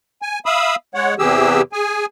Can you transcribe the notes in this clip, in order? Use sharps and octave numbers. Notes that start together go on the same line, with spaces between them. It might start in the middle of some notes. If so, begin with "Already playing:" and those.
G#5
E5 F5 B5 D#6 E6
G#3 C#5 F#5
E2 C3 E3 G4 G#4 E6
G#4 G#5